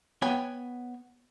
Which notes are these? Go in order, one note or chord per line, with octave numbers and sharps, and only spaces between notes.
B3 C#5 G5 G#5